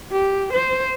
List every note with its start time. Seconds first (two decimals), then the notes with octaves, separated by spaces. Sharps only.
0.12 G4
0.53 C5